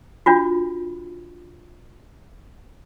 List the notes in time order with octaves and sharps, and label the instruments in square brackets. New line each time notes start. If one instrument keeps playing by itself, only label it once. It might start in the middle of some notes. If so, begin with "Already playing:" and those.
[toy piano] D4 F4 F#4